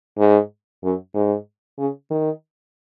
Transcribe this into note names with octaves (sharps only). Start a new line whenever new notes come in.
G#2
F#2
G#2
C#3
D#3